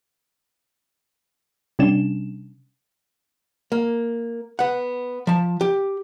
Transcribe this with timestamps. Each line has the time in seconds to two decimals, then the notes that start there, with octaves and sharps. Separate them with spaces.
1.79 C3 G3 C#4 D4 E7
3.72 A#3
4.59 B3 F#5
5.27 F3 A5
5.61 G4